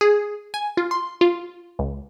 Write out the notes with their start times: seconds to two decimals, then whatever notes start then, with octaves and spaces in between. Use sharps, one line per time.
0.01 G#4
0.54 G#5
0.77 F4
0.91 C6
1.21 F4
1.79 C#2